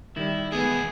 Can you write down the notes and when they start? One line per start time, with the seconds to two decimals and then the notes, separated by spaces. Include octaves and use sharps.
0.17 D#3 G3 E4
0.52 G#3 A3 B3 G#4
0.70 B2 E3